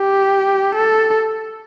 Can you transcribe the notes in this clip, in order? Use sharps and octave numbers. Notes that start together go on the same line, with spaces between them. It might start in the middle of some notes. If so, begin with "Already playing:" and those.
Already playing: G4
A4